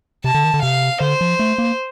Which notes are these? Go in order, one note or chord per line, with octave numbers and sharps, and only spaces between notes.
C3 A5
D3
D#3
D3
C3 F5
D3 C5
F3
A3
A#3